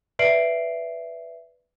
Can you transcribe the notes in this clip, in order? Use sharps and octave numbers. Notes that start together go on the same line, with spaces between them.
B4 D5 E5 C7 D7 F#7